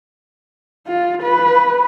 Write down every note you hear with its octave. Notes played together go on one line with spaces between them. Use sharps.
F4
B4